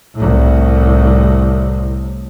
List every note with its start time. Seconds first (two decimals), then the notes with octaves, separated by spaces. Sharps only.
0.15 C2 A2